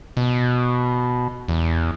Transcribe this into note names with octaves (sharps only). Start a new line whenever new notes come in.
B2
E2